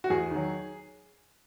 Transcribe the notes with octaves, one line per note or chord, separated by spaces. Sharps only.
F#4
E2 G#4
D#3 F#3